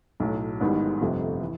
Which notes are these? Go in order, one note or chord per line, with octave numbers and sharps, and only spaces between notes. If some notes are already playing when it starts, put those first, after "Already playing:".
B1 A2 F#3
A1 G#2 D#3 G3 B3
G1 F2 C3 F3 A3
E3